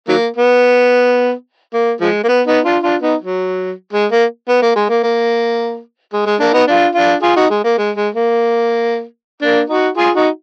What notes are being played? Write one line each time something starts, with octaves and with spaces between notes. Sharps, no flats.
D#3 F#3 A#3
B3
A#3
F3 G#3
A#3
B3
B3 D#4
D4 F4
D4 F4
B3 D#4
F#3
G#3
A#3
B3
A#3
G#3
A#3
A#3
G#3
G#3
A#3 D4
B3 D#4
D4 F4
D4 F4
F4 G#4
D#4 F#4
G#3
A#3
G#3
G#3
A#3
A#3 D4
D#4 F#4
F4 G#4
D#4 F#4